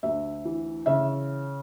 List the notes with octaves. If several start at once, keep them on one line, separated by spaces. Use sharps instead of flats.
D2 E5
E3
C#3 E5